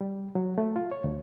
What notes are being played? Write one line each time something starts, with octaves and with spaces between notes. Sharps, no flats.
G3
F#3
A3
F4
C#5
D2